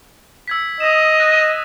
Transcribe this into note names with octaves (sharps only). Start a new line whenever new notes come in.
E6 G#6 B6
D#5 D#6 E7
F#6 A#6 D#7